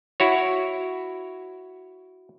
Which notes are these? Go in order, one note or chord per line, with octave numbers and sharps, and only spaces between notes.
E4 F#4 C#5